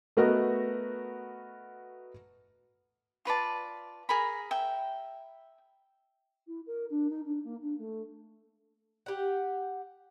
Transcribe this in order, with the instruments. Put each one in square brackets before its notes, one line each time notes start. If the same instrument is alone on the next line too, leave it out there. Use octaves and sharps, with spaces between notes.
[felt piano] A3 B3 F#4 A#4 D#5 F#5
[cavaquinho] F4 B4 D5 A5
G#4 A#4 A#5 B5
E5 G5
[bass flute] E4
A#4
D4
D#4
D4
A#3
D4
A3
[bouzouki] G4 F#5